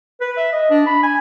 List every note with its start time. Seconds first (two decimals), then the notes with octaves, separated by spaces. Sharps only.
0.21 B4
0.37 E5
0.53 D#5
0.70 D4
0.86 B5
1.03 G#5